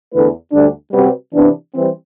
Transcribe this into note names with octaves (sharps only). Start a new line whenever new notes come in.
E2 D3 A3 E4 B4
D2 D3 G3 D4
C3 G3 C4 F#4 B4
C3 E3 B3 D4
E3 G3 C4